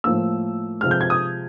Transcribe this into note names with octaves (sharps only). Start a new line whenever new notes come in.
A2 F3 A#3 E6
C3 F3 G#3 F6
G6
G#6
D#6